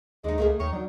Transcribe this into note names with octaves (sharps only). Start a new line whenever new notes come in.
D#2 G#3 D4 D#4
C#2 A3 A#3 G#4
D#2 D#3 C#5
F#3 D4